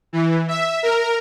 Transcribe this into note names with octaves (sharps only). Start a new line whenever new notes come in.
E3
E5
A#4